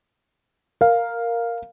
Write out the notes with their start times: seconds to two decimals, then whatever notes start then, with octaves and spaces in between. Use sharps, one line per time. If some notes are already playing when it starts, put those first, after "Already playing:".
0.81 A#4 F5